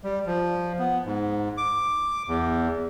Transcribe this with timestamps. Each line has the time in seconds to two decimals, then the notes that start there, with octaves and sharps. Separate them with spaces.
0.04 G3
0.26 F3
0.79 B3
1.05 G#2
1.57 D6
2.28 E2